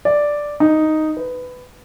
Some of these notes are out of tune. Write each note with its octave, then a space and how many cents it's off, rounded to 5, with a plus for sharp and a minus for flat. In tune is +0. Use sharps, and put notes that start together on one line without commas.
D5 +0
D#4 +0
B4 +15